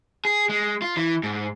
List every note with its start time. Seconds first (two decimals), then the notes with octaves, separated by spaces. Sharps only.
0.25 G#4
0.49 G#3
0.82 F4
0.97 E3
1.23 G#2